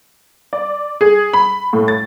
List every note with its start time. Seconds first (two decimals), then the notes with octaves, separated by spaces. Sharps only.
0.53 D5
1.01 G#4
1.33 B5
1.73 A2
1.88 A6